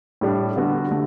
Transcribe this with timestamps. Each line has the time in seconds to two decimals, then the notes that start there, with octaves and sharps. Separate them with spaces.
0.21 A2 G3 D4
0.56 D3 G3 B3 F#4
0.91 D3 A3